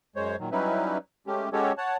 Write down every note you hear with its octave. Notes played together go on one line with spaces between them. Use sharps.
F#2 G#3 C5 C#5
A#2 D#3 F#3
F#3 G3 C#4 D#4 E4 B4
G#3 A3 C#4 G4
G#3 C#4 F#4 G4 A4 C#5
C#5 F#5 A5